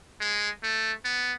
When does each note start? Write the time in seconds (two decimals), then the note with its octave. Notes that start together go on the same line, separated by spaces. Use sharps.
0.20 G#3
0.63 A3
1.05 B3